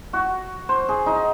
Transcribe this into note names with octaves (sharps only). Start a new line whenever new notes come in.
F#4
C5
G#4
D#4